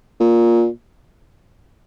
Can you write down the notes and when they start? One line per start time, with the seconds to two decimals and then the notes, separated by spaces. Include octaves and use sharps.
0.20 A#2